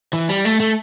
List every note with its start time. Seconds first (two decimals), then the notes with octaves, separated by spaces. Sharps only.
0.13 E3
0.29 G3
0.45 A3
0.60 A3